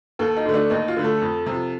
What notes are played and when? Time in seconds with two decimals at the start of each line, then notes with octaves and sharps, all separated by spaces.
0.19 D#2 A4
0.37 D#4
0.45 D3 A3
0.54 D4
0.70 D#2 D#4
0.88 F4
0.96 D3 A3
1.04 A4
1.21 F2
1.46 C3 F3